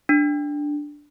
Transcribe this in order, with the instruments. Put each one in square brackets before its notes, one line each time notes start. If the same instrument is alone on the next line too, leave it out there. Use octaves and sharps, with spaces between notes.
[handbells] D4